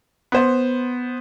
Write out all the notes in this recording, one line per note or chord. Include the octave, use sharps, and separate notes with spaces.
B3 C5